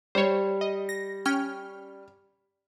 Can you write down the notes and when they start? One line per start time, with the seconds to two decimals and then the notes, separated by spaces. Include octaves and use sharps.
0.15 G3 C5 C#5
0.61 D#5
0.89 A#6
1.25 C#4 G5 F6